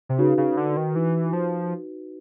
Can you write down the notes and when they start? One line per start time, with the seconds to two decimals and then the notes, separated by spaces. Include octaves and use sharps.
0.09 C3
0.18 C#3 D#4 F#4 B4
0.38 C#3
0.57 D3
0.77 D#3
0.96 E3
1.33 F3